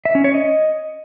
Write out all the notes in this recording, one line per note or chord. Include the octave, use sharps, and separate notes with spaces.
E5
C#4
C#5
D#5